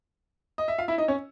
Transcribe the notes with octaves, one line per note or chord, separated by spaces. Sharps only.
D#5
E5
F4 F5
E4 E5
D#4 D#5
C#4 C#5